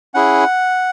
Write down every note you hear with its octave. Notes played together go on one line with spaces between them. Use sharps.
C#4 E4 G#4 F#5